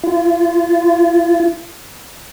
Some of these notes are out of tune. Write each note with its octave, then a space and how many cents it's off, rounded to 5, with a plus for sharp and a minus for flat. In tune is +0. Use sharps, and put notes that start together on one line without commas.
F4 -35